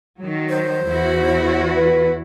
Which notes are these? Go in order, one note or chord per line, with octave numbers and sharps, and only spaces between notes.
D#3 F#3
C5
E2 E4 F#4
B4